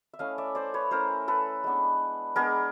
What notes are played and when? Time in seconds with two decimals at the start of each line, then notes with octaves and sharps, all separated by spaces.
0.13 E5
0.19 A3 C#4 E4 D#5 F5
0.38 D5 E5
0.55 C5 D5
0.74 B4 C#5
0.91 A3 C#4 E4 A#4 C5
1.28 A4 B4
1.64 G#3 B3 D4
2.36 G#3 B3 D4 G#4 A#4